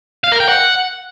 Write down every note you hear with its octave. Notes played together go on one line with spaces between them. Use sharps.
F5
A#4
G5
F#5